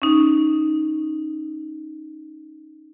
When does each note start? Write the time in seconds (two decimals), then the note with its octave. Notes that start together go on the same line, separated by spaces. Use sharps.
0.02 C#4 D#4